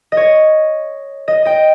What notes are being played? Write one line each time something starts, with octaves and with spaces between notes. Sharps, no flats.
D#5
C#5
D#5
D#5 G5